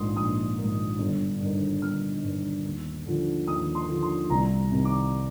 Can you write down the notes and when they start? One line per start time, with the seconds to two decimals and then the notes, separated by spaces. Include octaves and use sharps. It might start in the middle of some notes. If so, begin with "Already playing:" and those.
Already playing: A#1 G#2 D#3 C6 D#6
0.17 A#1 D#6
0.58 G#2 D#3
0.99 G1
1.41 G2 D#3
1.82 G1 F6
2.23 G2 D#3
2.65 D#2
3.06 D3 F3
3.47 D#2 D#6
3.75 C6
3.89 D3 F3
4.03 C6
4.30 C2 A#5
4.71 C3 D#3
4.85 D6